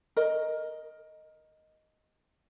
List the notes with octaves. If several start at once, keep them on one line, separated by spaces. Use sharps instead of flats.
A#4 D#5